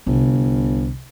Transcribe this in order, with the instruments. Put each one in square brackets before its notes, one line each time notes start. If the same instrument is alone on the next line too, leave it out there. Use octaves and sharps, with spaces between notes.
[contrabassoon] G1 [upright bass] C2